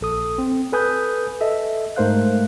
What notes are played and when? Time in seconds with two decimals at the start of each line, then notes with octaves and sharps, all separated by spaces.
0.01 A#1 A4 D#6
0.38 C4
0.72 A4 B4 G#5 D#6 G6
1.41 A4 D#5 E5
1.96 G#2 A3 A#4 C5 F5 F#6